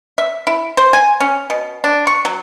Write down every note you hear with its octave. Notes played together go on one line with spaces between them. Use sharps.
E5
E4
C5
G#5
C#4
B2
D4
C#6
F#3